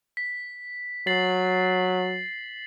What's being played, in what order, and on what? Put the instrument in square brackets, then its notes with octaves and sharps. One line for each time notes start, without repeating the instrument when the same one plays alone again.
[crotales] B6
[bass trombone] F#3 [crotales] A6 C7 F#7